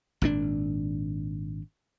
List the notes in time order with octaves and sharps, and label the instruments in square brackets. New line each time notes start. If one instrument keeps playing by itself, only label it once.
[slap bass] G#1 A#2 D4